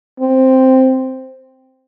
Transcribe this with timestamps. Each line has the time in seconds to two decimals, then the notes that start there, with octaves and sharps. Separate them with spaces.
0.20 C4